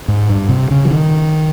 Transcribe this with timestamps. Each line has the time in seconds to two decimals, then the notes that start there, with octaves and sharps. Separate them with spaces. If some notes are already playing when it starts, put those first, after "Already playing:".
0.08 G#2
0.29 G2
0.49 C3
0.71 C#3
0.85 F3
0.91 D#3